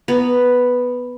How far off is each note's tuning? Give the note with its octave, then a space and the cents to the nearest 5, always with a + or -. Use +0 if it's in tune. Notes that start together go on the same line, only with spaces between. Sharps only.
B3 +0 A#5 -10